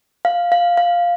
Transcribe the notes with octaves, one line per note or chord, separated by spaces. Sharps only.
F5
F5
F5